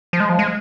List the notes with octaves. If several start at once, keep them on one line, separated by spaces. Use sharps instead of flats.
F3
G#3
F3
G#3